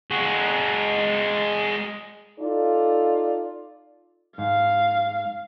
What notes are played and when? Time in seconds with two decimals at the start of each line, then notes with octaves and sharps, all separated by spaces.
0.11 G#3 F#4
2.40 D#4 F4 A4 D5
4.38 G#2 F5